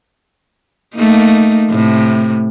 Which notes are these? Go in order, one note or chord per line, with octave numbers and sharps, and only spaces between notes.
A3 A#3 D#4
A2 C3